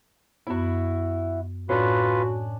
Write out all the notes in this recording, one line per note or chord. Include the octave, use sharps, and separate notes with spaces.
F#2 B3 E4 F#4
A2 C#4 D4 F4 F#4 B4